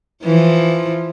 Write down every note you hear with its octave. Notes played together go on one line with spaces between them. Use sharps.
E3 F3